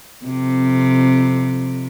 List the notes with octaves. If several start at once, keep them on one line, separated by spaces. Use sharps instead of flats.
F2 C3